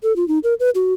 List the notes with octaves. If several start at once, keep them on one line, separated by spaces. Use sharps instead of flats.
A4
F4
D#4
A#4
B4
F#4